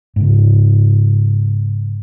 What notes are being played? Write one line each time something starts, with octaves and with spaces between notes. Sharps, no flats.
G#2 C#3